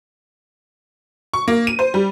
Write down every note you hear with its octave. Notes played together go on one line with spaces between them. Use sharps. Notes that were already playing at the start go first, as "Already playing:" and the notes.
C#6
A#3
D#7
C5
G3